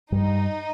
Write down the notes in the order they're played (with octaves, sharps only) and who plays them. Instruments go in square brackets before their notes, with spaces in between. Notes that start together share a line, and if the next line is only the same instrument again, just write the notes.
[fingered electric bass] G2 G3 [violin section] D#4